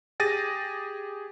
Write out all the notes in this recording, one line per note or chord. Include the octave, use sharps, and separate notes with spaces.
G4 G#4 A6 A#6 D#7